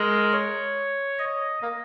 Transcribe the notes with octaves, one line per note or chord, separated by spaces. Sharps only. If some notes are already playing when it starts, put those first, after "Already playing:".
Already playing: G#3 A#4
C#5
D#5
A#3